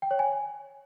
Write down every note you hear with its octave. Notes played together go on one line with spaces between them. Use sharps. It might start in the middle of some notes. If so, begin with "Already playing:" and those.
G5
C#5
G#5